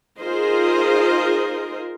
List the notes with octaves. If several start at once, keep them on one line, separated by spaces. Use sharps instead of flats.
D#4 F4 G#4 A#4 C5 D#5